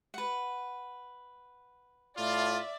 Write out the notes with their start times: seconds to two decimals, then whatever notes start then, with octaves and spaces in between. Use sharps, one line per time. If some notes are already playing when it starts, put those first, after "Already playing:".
0.14 B4 F#5
2.17 A2 F4 D5 E5